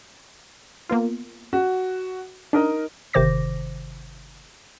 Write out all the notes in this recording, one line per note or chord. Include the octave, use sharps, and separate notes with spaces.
A#3 B3 F4
F#4
D4 D#4 A#4 D#5
G1 C3 D#3 C5 D6 A#6